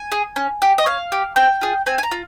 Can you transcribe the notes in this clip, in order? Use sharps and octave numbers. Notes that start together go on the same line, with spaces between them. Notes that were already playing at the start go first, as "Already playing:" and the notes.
Already playing: G#5
G#4
C#4
G4
D#5
C#4 F5
G4
C4 G5
F4 G#4
C4 G#5
G#5
A#5
F4